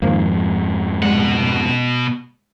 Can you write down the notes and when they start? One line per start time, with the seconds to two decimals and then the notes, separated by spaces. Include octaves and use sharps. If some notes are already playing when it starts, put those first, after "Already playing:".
0.02 F2 G#2 D#3 F3 A#3
1.03 B2 G3 G#3 F#5